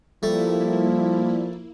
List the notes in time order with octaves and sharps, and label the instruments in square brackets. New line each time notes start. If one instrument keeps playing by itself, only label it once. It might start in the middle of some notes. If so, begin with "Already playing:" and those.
[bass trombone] F3 [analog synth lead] G3 [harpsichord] A3 [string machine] A#3 E4